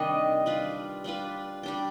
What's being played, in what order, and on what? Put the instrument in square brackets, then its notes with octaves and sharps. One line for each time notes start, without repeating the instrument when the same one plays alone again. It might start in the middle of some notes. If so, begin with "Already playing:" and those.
Already playing: [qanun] C3 D#3 G3 D4 [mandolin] D#5
[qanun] G3 D4 F4 B4
G3 D4 F4 B4
G3 D4 G4